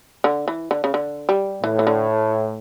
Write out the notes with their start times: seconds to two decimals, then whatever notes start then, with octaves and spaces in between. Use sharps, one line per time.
0.24 D3
0.48 E3
0.71 D3
0.84 C#3
0.94 D3
1.29 G3
1.63 A2 E3
1.79 E3
1.87 D3